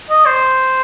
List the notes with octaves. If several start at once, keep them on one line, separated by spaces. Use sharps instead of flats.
D#5
C5